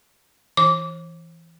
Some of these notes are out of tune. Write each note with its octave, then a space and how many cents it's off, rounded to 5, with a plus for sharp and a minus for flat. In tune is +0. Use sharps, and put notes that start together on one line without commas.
E3 +5 D6 -20